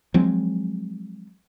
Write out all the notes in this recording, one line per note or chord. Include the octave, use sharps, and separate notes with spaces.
F3 F#3 G#3 C4